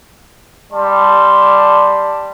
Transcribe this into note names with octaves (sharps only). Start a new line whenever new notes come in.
G3 D5 A5 C6